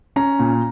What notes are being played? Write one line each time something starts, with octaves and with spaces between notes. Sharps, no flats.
C#4 A#5
A#2